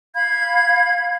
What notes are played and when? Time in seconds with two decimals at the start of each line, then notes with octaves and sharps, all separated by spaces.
0.14 F5 B5 G#6